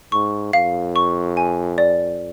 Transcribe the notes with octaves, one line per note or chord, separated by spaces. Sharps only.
G#2 C#6
F2 F5
C#6
G#5
D5